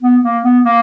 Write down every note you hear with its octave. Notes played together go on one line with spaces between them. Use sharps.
B3
A#3
B3
A#3